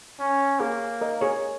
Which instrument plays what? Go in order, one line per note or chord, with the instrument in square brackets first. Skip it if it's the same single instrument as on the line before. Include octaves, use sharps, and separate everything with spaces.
[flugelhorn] C#4
[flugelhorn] A#3 [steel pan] G#4 C#5
[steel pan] A#4 D#5
G#4 C#5